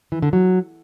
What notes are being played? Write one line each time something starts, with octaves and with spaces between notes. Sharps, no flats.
E3
D3
F#3